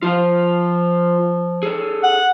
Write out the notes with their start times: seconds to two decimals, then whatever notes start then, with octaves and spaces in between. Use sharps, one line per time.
0.02 F3 F4 C5 F5
1.63 G#4 A4 C#5
2.03 F#5